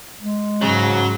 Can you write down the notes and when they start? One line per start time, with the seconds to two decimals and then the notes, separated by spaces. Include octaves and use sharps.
0.21 G#3
0.62 G#2 C#3 F#3